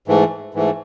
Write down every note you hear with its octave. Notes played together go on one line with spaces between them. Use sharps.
G#2 E3 A3
G#2 E3 A3